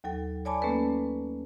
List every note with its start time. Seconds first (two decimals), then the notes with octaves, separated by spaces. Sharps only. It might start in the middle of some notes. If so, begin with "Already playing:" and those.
0.04 D#2 F#3 A4 G5
0.45 C#5 D5 G#5 A5 B5 D6
0.62 A3 A#3 C#4 A4 B4